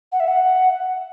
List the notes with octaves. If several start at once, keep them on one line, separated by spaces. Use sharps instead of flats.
F#5
E5
F#5